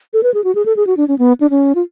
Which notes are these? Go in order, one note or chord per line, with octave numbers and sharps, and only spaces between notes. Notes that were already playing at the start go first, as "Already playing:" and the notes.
A4
B4
G#4
F#4
G#4
A4
G#4
F#4
D4
C#4
B3
D4
C#4
F4